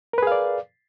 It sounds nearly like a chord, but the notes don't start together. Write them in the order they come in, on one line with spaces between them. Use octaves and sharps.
A#4 B4 G#4 F5 D5